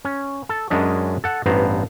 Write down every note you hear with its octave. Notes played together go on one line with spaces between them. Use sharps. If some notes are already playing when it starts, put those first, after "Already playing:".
C#4
A4
F#2 G#3 C#4 D4 D#5
A4 F#5
A1 G2 B3 C5 A#5